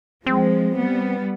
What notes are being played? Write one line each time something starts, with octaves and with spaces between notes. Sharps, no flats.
F3 G#3 C4
G3 B3